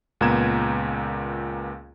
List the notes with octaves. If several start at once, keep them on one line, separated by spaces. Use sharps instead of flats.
C#2 A#2 B3 A#5 G#6 E7